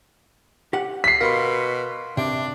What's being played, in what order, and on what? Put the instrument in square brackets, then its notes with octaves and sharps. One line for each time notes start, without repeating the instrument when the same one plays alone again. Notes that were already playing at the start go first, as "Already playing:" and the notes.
[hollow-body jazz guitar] G4 F#5
[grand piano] B6 C7
[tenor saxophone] B2 [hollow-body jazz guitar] A#4 [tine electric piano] F5 B5 C6
[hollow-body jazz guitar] C3 [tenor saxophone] D4